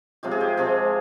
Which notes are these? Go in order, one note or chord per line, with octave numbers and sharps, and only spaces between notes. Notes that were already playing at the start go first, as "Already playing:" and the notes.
C3 F3 G#3 G4
G#4
G4
C3 F3 G#3 G#4